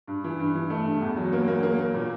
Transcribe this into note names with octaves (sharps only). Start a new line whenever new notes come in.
G2
E3
G2
E3
A3
G2
E2
F#3
A#3
A#3
A#3
A#3
A#2